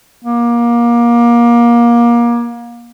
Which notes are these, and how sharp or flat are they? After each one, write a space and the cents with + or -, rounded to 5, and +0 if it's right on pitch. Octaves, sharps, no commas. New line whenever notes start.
A#3 +25